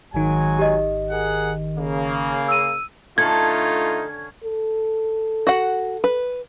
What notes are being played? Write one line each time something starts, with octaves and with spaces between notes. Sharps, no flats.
G#1 D#3 F#3 G#3 G#5
G4 D#5
G#4 A#4 F#5
C#3 A#3
E6 D#7
D3 A3 C#4 D#4 F4 A4 G#6
A4
F#4 F#5
B4